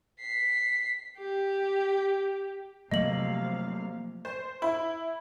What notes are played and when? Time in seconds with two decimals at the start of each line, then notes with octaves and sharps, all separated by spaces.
0.21 B6 C7
1.17 G4
2.91 C3 F3 F#3 A3 A#3 D#5 F5 F#7
4.25 C5
4.62 E4